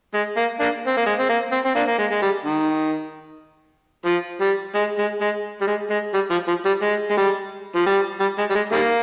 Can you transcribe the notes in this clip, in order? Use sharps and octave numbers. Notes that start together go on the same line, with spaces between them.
G#3
A#3
A#3 D4
C4
A#3
G#3
C4
A#3
C4
C4
A#3 D4
A#3
G#3
G#3
G3
D#3
F3
G3
G#3
G#3
G#3
G3
G#3
G#3
G3
F3
F3
G3
G#3
G#3
G3
F3
G3
G3
G#3
G3
G#3
D#3 G3 A#3